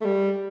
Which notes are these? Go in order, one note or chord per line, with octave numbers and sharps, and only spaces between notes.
A3
G3